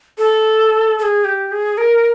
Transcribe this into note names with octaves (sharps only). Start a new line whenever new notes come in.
A4
A4
G#4
G4
G#4
A#4